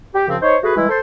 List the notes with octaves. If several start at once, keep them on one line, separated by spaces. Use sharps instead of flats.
G4
F#2 C#3 F3 C4
D#4 C5 C#5
A3 F#4 G#4 B4
E3 G3 G#3 E4
A4 C5